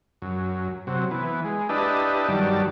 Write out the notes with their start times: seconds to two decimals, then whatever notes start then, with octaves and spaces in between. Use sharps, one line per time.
0.22 F#2
0.87 C3 F#3
1.11 E3 B3
1.44 G#3
1.69 D4 E4 G4 B4 D#5 A5
2.28 G2 D#3 F#3 G3 D5 A5